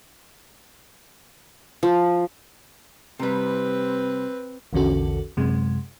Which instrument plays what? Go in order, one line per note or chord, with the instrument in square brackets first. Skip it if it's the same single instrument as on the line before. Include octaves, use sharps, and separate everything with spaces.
[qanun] F3
[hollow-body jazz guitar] C3 G3 [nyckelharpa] C4 B4
[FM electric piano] A#1 E2 D3 C#4 F#4 A4
F#2 C3 G#3